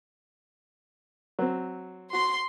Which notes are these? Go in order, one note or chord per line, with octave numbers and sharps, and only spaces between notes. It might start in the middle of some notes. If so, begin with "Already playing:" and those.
F#3 C4
F#4 C6